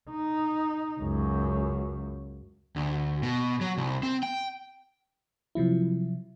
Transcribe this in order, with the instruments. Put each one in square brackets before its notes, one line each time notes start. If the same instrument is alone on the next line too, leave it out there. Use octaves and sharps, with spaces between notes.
[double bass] D#4
C#2 F#2
[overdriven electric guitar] D2
B2
F#3
C2
C4
G5
[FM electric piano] C3 F3 F#3 E4